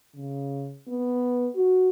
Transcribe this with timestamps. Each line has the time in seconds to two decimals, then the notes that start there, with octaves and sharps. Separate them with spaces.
0.16 C#3
0.88 B3
1.55 F#4